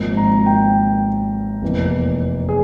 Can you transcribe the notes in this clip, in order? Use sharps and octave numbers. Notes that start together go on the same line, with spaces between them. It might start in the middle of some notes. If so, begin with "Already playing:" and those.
Already playing: G#1 G#2 F3 A#3
A#5
G5
F1 E2 E3 A#3
G#4